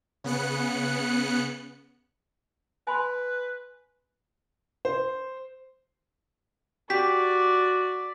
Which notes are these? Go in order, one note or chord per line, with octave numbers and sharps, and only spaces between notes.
C#3 B3 F#6 C#7
B4 G#5 B5 C6
C5
F#4 G4 D5 B6